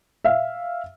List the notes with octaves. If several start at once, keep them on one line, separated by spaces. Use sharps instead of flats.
E5 F5